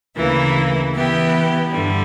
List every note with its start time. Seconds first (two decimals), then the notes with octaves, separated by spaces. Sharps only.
0.15 D2 C#3 E3 A#3 E4
0.94 E3 B3 E4 G4
1.70 G2 D3 G3